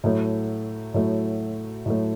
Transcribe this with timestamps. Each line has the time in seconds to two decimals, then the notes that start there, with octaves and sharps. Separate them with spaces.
0.04 A2 F#3 A3
0.94 A2 F#3 A3
1.86 A2 F#3 A3